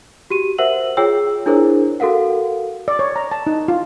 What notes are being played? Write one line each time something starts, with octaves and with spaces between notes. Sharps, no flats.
F#4 G4 D#7
A#4 C5 E5 F#5 E6 F#7
F4 G#4 C#5 G5 E6
D4 E4 G#4 A#4 C5 C#5
F#4 A4 A#4 F5 F#5
D5
C#5
A#5
A5
D#4
F4